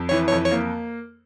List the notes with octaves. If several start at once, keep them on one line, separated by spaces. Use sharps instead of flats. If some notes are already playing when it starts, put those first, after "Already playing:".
Already playing: F2
E3 C#5
C#5
F2
C#5
A#3